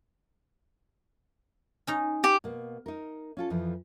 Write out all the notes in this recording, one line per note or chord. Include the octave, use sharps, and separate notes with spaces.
C#4 D#4 A#5
G4
B2 A#3
D#4 A#4
C#4 F4 A4
F2 E3 F3